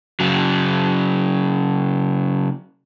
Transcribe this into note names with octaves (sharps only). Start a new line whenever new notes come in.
C#3 F#3